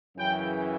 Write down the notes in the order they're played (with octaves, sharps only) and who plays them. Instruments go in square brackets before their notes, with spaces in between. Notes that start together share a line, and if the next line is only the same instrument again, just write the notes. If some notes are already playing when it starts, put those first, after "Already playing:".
[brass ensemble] F#2 C#3 E3 G5